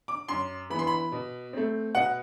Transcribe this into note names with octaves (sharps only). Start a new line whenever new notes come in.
D6
F#2 C6
E3 B3 B5 C6
B5
B2
A3 C4
B2 F#5